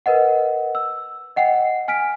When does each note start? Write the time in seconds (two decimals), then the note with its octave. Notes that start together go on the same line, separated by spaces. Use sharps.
0.06 A#4 B4 D#5 F#5
0.75 E6
1.36 D#5 F#5 G5 C7
1.88 G#5 F6 B6 D7